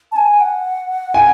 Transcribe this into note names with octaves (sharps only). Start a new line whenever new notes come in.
A5
G#5
F#5
G#5